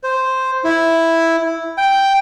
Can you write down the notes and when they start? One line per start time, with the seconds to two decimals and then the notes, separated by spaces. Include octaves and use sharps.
0.04 C5
0.64 E4
1.78 G5